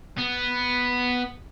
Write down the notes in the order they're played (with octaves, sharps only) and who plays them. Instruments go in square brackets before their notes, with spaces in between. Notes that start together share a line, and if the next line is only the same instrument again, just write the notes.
[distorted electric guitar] B3